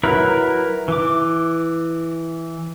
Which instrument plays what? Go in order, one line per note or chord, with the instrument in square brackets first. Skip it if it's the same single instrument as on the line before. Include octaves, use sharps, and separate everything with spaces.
[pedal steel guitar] F#3 E4 A#4 B4
E3 D6